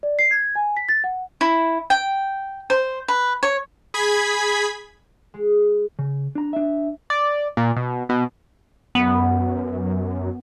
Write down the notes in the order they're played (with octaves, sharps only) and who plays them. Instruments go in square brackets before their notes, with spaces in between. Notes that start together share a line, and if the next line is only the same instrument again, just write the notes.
[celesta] D5
C7
G#6
G#5
B6
A6
F#5
[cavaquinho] E4
G5
C5
B4
C#5
[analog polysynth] G#4 B5 G#6 B6
[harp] G#3
[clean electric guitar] C#3
D4 A#5
D4 E5
[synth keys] D5
A#2
B2
B2
[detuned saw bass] F#2 [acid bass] B3